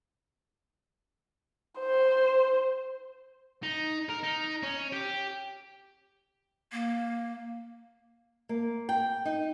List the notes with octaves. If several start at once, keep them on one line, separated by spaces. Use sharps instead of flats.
C5
D#4
A#4
D#4
C#4
G4
A#3
A#3
G5
D#4